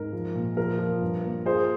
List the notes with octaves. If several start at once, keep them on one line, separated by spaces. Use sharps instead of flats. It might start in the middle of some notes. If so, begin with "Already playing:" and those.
Already playing: G#2 A#4
F3
A#2
F3 A#4
F3
G2
A#3
F4 G#4 C5